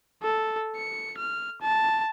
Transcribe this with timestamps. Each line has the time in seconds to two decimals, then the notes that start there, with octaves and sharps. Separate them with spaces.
0.23 A4
0.76 C#7
1.17 F6
1.62 A5